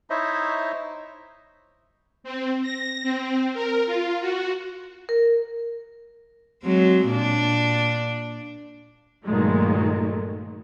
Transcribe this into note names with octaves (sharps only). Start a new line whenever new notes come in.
D#4 E4 C5 C#5 D#5 E5
C4
A#6
C4
A#4
F4
F#4
A#4
F#3 G#3 C4
A#2 D4
G2 A#2 D#3 F#3 G#3 A3